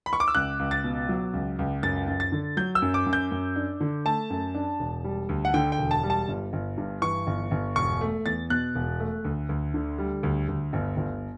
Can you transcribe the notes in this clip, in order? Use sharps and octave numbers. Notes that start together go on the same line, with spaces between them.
B5
C#6
D6
E6
C#2 F#6
C#2
A6
B2
F#3
C#2
C#2
F#2 A6
F#2
A6
D3
F#3 G6
E6
F#2
D6
F#2
G6
F#2
D4
D3
A3 A5
F#2
D4
E1
G3
D2
F#5
D3 G5
G5
E1
A5
G3
A5
G1
G1
G2
E3 C#6
G1
G1
E1 C#6
A3
E2 A6
B2 F#6
E1
A3
D2
D2
D3
G3
D2
D2
G1
G1